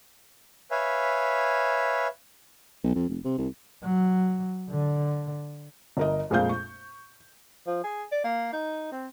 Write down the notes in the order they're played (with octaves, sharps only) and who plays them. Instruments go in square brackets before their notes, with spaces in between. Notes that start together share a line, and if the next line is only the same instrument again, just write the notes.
[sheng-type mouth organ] B4 C#5 E5 F5 G#5
[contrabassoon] B1
F2
F1
C3
C2
[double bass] F#3
D3
[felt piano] G1 A#4 D#5
A#1 F2 A#2 G#3 F5 G6
C#6
[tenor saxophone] F3
G#4
D5
A#3
D#4
C4